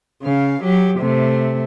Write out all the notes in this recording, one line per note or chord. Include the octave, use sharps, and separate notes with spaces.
C#3 F5
F#3 G4
C3 A3